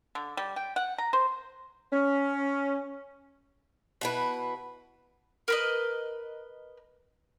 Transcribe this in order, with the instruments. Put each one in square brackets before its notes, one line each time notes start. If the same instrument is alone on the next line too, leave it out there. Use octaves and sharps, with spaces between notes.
[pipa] D3
G3
G5
F#5
A#5
C5
[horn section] C#4
[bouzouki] B2 E4 B4
[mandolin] A#4 B4 D#5